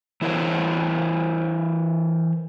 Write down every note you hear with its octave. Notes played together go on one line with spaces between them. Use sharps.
E3 E4 A#4 C5 C#5